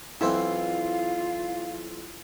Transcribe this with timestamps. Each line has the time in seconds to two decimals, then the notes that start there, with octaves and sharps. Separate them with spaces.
0.21 B1 E3 C4 E4 F4 F5